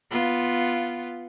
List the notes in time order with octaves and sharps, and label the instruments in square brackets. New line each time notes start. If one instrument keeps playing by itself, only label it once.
[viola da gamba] B3 F4